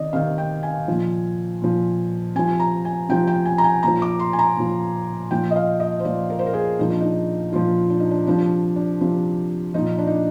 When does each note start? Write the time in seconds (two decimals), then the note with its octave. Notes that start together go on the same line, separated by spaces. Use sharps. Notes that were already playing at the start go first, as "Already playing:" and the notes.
Already playing: C3 D#3 D5 D#5
0.13 C3 D#3 F5
0.38 G5
0.63 G#5
0.88 A#2 F3
1.62 A#2 F3
2.35 C3 F3 G#5
2.60 A#5
2.85 G#5
3.09 C3 F3 G5
3.27 G5
3.46 G#5
3.58 A#5
3.64 G#5
3.83 A#2 F3 A#5
4.02 D6
4.19 C6
4.33 G#5
4.39 A#5
4.57 A#2 F3
5.31 A#2 F3 G5
5.51 D#5
5.56 F5
5.80 D#5
6.00 C5
6.04 A#2 F3 D5
6.30 A#4
6.39 C5
6.46 A#4
6.53 G#4
6.79 A#2 F3 D#4
6.89 D4
7.01 D#4
7.53 A#2 F3 F4
7.90 D4
8.00 D#4
8.11 D4
8.27 C3 F3 D4
8.76 D4
9.01 C3 F3
9.74 A#2 F3 D#4
9.98 D4
10.07 D#4
10.15 D4